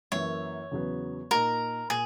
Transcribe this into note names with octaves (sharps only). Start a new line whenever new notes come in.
F#2 E3 A#3 C#5
E2 C#3 F#3 B3
A#2 A#3 D#4 A#4
A#2 G#4